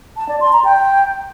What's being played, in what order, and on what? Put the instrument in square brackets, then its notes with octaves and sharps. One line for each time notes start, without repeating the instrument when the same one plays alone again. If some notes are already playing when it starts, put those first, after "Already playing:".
[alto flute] A5
D5
C6
A#5
G5